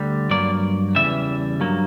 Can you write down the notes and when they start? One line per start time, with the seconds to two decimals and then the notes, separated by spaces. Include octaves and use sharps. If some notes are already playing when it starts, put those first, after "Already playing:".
Already playing: D2 D3 G3
0.30 G2 F#3 A#3 D5
0.95 E2 C#3 E3 G3 E5
1.60 G2 F#3 A#3